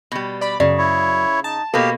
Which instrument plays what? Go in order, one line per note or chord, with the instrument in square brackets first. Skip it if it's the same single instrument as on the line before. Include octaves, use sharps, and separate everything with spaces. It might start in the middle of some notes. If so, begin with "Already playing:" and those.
[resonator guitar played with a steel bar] B2 G3
[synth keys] D5 B5
[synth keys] F#2 [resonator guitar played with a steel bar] C#3 [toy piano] D5
[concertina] E4 C#5
[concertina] D#4 [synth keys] A5
[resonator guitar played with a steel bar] B2 A#3 [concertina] G4 F5 [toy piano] A4